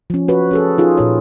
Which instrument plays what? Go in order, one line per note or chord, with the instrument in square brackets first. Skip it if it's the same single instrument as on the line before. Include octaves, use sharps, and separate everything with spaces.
[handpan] F3 C#4
F#4 B4 C#5
C#4 G#4 A4
D#4 F4 G#4
A#2 F4 C#5